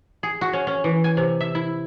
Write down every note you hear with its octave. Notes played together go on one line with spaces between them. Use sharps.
G#4
F#4
C#4
C#4
E3
G#5
C3
E5
E4